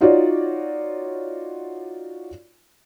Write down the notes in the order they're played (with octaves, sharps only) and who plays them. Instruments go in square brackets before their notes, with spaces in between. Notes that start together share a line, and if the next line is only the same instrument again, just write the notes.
[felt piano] D#4 F4 F#4 C#5 D5